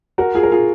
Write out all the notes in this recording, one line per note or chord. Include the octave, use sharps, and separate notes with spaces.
F#4 A#4
F4 G#4
A#4
F4 G#4